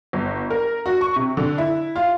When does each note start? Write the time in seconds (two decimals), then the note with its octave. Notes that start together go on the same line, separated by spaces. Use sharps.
0.13 G1
0.50 A#4
0.86 F#4
1.01 C#6
1.16 C3
1.37 D3
1.58 E4
1.96 F4